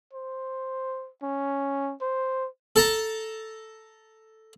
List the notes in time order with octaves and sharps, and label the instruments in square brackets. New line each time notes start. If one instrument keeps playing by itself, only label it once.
[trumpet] C5
C#4
C5
[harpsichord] A4 A5 A#5